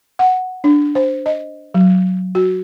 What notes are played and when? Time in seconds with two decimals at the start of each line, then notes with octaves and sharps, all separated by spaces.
0.19 F#5
0.64 D4
0.95 C5
1.26 D#5
1.74 F#3
2.35 F#4